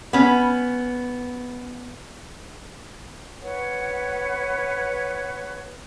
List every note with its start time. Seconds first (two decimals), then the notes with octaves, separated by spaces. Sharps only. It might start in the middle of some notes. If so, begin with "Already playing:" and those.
0.13 B3 C#4
3.43 B4 C#5 F#5